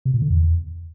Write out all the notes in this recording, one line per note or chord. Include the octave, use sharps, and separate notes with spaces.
C3
A#2
D3
E2